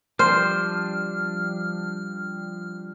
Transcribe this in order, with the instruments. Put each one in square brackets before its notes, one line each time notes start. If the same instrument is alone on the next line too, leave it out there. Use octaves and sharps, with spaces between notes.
[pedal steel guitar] F3 G3 D4 [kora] C5 [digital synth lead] F6